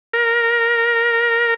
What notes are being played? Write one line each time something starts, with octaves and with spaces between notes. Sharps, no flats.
A#4